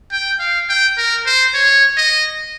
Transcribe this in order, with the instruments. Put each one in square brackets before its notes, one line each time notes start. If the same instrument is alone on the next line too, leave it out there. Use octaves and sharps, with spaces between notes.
[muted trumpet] G5
F5
G5
A#4
C5
C#5
D#5